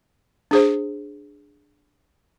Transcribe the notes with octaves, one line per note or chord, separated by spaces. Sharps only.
D4 G#4 C5